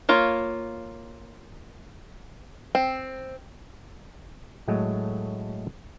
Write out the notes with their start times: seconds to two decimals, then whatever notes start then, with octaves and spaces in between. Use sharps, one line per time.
0.09 A#3 F4 C#5
2.75 C4
4.68 A2 F#3 G#3 A3